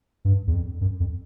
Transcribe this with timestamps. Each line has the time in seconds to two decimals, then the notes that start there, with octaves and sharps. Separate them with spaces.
0.25 G2
0.47 E2
0.53 F2
0.81 F#2
1.00 F2